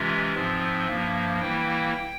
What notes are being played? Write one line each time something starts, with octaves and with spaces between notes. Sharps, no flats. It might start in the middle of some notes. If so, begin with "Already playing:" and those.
Already playing: C3 E3 G#3 C#4 F4 E5
G#2 F3 C4 F4
G2 F3 A#3
E3 G3 A#3 E4 G5